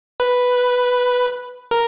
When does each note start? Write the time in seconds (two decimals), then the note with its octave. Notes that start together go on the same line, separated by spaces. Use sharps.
0.20 B4
1.71 A#4